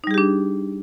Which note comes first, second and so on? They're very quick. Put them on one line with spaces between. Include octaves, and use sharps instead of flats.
D#4 G3 G#4 G4 D4